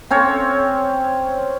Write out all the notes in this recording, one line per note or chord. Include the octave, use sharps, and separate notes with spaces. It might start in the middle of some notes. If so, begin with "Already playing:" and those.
C4 C#4 C#5